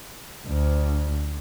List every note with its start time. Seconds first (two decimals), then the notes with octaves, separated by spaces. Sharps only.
0.47 D2